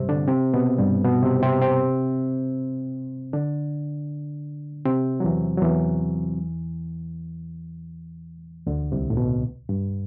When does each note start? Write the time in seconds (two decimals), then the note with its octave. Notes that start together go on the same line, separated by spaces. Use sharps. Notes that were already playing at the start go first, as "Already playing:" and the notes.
Already playing: G2 C3 G3 C4
0.09 D3 D4
0.28 C3 C4
0.54 B2 B3
0.78 G2 G3
1.05 B2 B3
1.23 C3 C4
1.43 C3 C4
1.61 C3 C4
3.33 D3 D4
4.85 C3 C4
5.20 F#3
5.24 E2 E3
5.57 F#3
5.62 E2 E3
8.66 D2 D3
8.92 C2 C3
9.10 A2
9.17 B2
9.69 G2